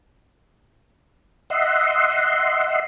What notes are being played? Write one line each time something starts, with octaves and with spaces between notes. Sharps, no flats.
D#5 E5 F#5 C6